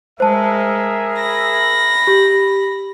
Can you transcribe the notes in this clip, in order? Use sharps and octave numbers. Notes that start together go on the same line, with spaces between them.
G#3 G#4 A#4 C5 E5 A5
B5 A#6
G4